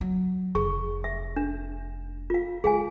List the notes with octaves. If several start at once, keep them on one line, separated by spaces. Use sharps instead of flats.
F#3
F1 G#4 C#6
E5
D4
F4 F5
G#3 G#4 F5 G#5